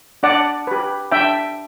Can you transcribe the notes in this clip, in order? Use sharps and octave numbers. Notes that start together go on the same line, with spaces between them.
D4 D5 F#5
G4 B4
D4 E5 G5